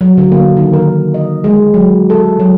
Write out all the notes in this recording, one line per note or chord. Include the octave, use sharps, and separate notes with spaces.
F#3
D3
A#3
D#3
A#4
D#5
G#3
F#3
A4
F#3